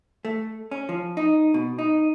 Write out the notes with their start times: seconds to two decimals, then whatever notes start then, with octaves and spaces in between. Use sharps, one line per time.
0.25 A3
0.71 C#4
0.89 F3
1.17 D#4
1.54 B2
1.78 D#4